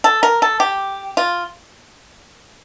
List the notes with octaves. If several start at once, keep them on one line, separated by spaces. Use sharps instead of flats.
A4
A#4
A4
G4
F4